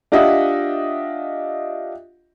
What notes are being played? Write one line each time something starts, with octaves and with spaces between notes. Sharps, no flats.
D4 F4 G4 D#5 E5 F#5